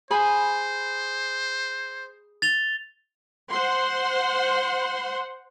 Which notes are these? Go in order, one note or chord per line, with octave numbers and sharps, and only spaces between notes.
G#4 C5 G#5 B5
A6 F7 G7
C5 F#5 C6